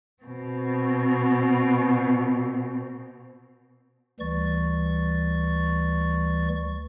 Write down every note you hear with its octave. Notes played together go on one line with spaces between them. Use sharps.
B2 C4
D2 E3 G3 C#6 A6